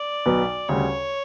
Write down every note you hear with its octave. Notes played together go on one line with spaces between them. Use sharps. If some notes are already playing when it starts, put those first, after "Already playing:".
Already playing: D5
B1 B2 F#3 B3
D2 C#3 G3 C#5